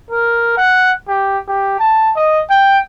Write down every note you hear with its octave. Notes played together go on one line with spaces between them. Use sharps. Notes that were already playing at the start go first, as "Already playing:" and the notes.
A#4
F#5
G4
G4
A5
D#5
G5